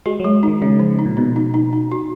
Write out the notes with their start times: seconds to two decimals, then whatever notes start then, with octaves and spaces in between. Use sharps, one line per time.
0.06 G#3 F#4
0.20 F#3
0.24 G#3
0.43 D#3 D#4
0.62 C#3 G#3
0.79 F3
0.99 D#4
1.06 A#2
1.17 B2 D#4
1.36 D#4
1.54 D#4
1.73 D#4
1.92 F#4